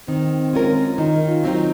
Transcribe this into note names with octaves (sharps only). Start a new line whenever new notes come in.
D#3 C4
G#3 C#4 F4 A#4
D#3 D#4
F4
F#3 C4 D#4